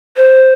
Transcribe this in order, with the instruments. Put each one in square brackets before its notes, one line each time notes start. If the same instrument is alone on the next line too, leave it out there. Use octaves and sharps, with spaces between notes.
[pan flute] C5